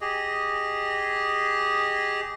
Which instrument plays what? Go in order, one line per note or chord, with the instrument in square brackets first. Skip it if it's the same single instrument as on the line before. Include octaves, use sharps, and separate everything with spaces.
[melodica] G4 G#4 D#5